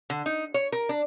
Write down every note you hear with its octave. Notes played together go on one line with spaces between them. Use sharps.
D3
D#4
C#5
A#4
D4